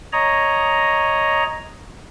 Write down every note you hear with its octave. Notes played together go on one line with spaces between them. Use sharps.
C#5 D#5 A#5